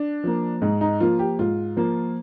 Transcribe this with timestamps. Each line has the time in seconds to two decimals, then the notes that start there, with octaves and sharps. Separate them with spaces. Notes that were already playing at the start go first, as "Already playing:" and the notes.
Already playing: D4
0.24 F3 A#3
0.62 G#2 D#4
0.81 D#4
1.00 F3 A#3 F4
1.19 G4
1.39 G#2 F4
1.77 F3 A#3